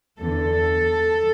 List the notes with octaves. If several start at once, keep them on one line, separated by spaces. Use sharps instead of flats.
E2 D3 A4